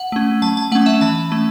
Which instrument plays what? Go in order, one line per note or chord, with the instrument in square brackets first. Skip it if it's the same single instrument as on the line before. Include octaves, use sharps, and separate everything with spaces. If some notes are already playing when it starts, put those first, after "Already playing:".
Already playing: [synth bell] F#5
A3 C#4
F#3 A5
A5
A3 C#4 F#5
E5
E3 A5
A3 C#4